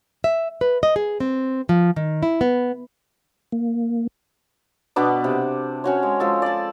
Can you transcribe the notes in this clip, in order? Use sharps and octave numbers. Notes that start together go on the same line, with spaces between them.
E5
B4
D#5
G#4
C4
F3
D#3
E4
B3
A#3
B2 B3 D4 D6
C3
C#4 F#4 C#5
G#3
F3 G#3 A4
D5 A5